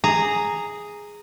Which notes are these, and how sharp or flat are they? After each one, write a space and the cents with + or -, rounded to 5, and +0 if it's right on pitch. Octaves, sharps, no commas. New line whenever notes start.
G#4 +0 A#5 -10